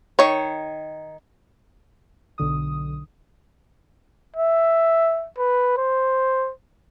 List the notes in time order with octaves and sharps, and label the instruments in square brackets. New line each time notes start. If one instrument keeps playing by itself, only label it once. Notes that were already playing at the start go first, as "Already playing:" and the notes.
[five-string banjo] D#3 C#5
[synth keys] B1 D3 D#6
[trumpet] E5
B4
C5